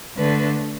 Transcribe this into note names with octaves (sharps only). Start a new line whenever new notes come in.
D3 A3 B4